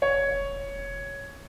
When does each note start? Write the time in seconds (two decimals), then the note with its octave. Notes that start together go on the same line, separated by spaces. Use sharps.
0.02 E1 C#5